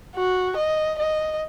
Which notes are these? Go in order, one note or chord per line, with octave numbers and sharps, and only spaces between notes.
F#4
D#5
D#5